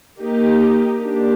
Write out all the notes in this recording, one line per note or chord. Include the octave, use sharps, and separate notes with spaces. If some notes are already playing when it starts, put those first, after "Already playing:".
A#3 D#4 G4
A#3 D4 G4